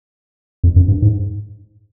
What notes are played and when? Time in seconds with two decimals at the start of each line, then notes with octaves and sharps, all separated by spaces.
0.64 F2
0.76 F#2
0.88 G2
1.02 G#2